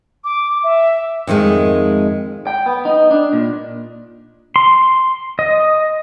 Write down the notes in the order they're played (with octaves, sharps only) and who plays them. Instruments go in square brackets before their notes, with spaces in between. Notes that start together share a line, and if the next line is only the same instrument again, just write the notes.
[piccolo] D6
E5
[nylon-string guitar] F2 D#3 E3 G#3 A3
[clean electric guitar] G5
B3
D#4
D4
A#2
[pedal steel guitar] C6
D#5